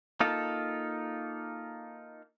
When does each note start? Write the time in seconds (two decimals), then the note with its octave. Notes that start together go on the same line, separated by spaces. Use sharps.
0.20 A#3 D#4 F4 A4